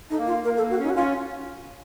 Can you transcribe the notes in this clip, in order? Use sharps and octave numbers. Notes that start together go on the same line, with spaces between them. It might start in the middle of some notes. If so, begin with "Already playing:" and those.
A3 D#4
A#3
F4
A#3 A#4
A4
A#3
F#4
C#4 D#4
F#4
C#4 F4